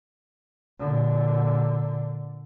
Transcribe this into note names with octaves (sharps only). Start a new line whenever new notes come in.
A#2 D3